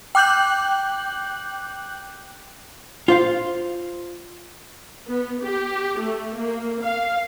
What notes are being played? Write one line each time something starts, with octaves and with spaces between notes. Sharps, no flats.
G5 D6 F#6 G6 F#7
F4 C5 F5
B3
G4
A3
A#3
F5